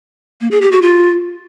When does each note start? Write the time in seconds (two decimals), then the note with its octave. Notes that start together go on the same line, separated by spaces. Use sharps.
0.41 A#3
0.51 G#4
0.61 G4
0.72 F#4
0.82 F4